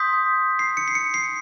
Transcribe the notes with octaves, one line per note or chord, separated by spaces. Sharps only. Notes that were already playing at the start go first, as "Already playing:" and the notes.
Already playing: C6 D#6 G6 B6
C7
C#7
C7
C#7
C7